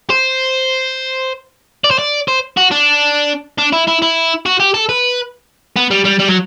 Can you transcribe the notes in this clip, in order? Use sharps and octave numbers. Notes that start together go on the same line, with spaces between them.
C5
D5
C5
D5
C5
F#4
D4
D4
E4
E4
E4
F#4
G4
A4
B4
B3
G3
G3
G3
F#3